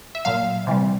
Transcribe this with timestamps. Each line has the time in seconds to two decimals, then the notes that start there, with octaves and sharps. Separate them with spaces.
0.15 E5
0.25 A#2 F#3 F5
0.67 C3 E3 G3